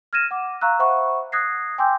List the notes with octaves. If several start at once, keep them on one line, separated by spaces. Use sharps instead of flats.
F6 G#6 A#6 D#7 E7
F#5 D6
F5 A#5 C#6 E6 F#6
C5 E5 F#5 B5 C#6
D#6 F#6 G#6 A#6 C7
G5 G#5 C6 D6 E6 G6